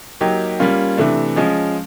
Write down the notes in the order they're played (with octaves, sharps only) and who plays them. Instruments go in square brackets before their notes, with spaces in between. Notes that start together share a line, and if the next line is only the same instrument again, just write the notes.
[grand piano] F#3 A#3 D#4 G4
G3 A#3 C#4 F4
C3 E3 A3 D4
F3 G#3 C#4